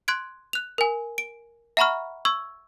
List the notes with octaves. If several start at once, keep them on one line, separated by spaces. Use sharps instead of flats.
C6 F#6 G#6 D7
F#6 F7
A#4 G#5
D7
E5 F#5 A#5 B5 C#6 F6
C#6 E6 G#6